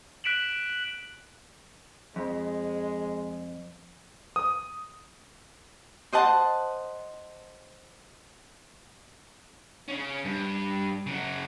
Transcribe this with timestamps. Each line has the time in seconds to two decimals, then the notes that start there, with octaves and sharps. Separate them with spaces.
0.24 F#6 B6 D7 E7 F#7
2.16 F2 G#3
4.36 D#6
6.13 C5 D#5 F#5 A5
9.88 C#3 C#4
10.25 G2
11.06 C#3 F#3